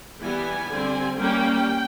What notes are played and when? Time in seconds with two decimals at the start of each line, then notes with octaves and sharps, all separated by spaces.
0.21 E3 G3 B3 G#5
0.70 D3 G3 C4
1.18 G3 A#3 C#4 G5